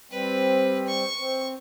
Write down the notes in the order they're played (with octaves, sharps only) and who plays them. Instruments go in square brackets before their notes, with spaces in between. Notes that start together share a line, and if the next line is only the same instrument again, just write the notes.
[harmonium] G3 C4 [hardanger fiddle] B4
[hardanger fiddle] C#6
[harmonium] C4